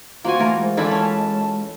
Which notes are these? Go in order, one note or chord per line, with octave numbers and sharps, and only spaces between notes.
A#3 F4 F#4 C5 G#5 C#6
E3 A3 A#4
G#3
E3 G#3 A3 E4 F4 B4 D5 B5
C#4 A5